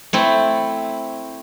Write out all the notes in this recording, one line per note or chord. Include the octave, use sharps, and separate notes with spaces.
A3 C4 E4